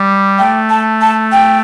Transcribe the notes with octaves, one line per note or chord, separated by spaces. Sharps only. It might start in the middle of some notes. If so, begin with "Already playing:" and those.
Already playing: G3
A3 G5
A5
A5
G5